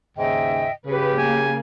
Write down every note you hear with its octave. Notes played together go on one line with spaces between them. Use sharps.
D#2 G#2 C#3 D#5 E5 G5
C#3 G4 B4
A#3 G#5